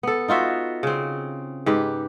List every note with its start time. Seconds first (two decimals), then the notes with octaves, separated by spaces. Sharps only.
0.03 B3 A4
0.28 D#4 F4 F#4 E5
0.83 C#3 C4
1.66 G#2 G4 B4